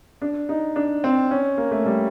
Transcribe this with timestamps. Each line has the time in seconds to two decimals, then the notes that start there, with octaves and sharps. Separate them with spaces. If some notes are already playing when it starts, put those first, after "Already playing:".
0.22 D4
0.49 D#4
0.76 D4
1.04 C4
1.31 C#4
1.58 A#3
1.71 A3
1.86 G3